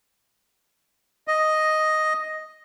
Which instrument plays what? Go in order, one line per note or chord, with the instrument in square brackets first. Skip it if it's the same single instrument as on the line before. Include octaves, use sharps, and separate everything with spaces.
[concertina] D#5